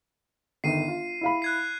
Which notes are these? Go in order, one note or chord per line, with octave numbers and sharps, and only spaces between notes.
G1 D#3 C7 D#7
F4
E4 F5 B5
F#6 G#6 C7